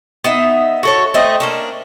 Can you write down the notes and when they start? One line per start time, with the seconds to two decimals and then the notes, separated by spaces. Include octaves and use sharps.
0.24 B3 D#4 E5
0.83 F#4 A4 C#5
1.14 A3 C4 D#5
1.40 A#3 C#4 D4